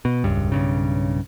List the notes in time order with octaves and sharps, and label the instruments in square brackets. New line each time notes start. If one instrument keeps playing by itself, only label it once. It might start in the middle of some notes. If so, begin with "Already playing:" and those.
[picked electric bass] B2
E1 C#2 G2
B1 G2 C#3